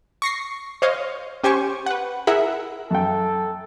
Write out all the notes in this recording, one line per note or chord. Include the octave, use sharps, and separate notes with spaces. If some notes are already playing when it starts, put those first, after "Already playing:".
C#6 A#6 C7
C5 C#5 D#5 F5
C#4 G4 C5 G#5 C#6
B4 F#5
E4 G#4 A#4 E5 F#5
F#2 A4 G5